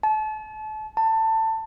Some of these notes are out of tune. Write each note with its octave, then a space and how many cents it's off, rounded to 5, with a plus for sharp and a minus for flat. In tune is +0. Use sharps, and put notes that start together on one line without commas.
A5 -35
A5 +20